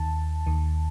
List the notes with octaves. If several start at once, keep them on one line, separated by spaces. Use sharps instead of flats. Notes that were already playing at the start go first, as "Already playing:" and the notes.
Already playing: D#2 D#3 A5
D#2 D#3